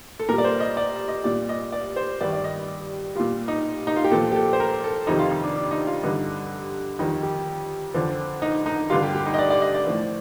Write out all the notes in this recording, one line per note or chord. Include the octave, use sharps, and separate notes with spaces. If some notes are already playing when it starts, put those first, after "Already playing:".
A4
A#2 G3 A#4
D5
C5
D#5
D5
D#5
A#2 G3 D5
D#5
D5
C5
G2 D#3 G3 D5
D5
D#5
A#2 G3 F4
D#4
D#4
F4
G4
A#2 F3 A4
G4
A4
C5
A#4
A4
F2 C3 D#3 G3 D#4
F4
D#4
D4
D4
D#4
F4
G2 D3 G3 D#4
F2 D#3 G3 D#4
G4
F2 D3 F3
D#4
D#4
G2 D3 G3 F4
G4
G4
D#4
D#5
D5
D5
D#5
D5
A2 F3